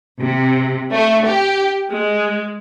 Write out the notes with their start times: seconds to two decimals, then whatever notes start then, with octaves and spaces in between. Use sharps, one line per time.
0.21 C3
0.90 A3
1.25 G4
1.92 G#3